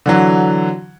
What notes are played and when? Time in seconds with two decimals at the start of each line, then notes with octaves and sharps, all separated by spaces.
0.06 D3 E3 F#3